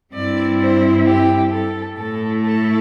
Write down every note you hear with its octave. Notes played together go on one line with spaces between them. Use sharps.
G2 G3 C4 E4 D5
C5
G4
A4
A2 A3 E4 A4
A4